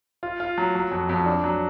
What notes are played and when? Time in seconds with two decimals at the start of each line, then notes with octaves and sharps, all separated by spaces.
0.23 F4
0.40 F4
0.58 F#3
0.75 F#3
0.91 F2
1.09 F2
1.26 D4
1.44 F#3